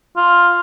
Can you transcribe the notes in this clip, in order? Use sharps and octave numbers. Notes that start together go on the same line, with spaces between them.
F4